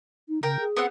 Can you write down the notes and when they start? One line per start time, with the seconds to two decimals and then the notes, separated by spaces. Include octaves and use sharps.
0.29 D#4
0.43 C#3 A#4 G5
0.60 G#4
0.76 B3 C4 F#5